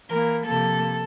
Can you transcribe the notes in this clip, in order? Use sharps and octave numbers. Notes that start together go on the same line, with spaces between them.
E3 A#3 A#4
C3 F3 A#3 A4